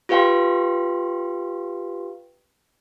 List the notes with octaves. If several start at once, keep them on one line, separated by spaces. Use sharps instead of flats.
F4 G4 B4 F5 G5 C6